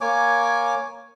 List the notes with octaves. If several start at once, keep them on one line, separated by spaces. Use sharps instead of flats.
A#3 C#5 G#5 D6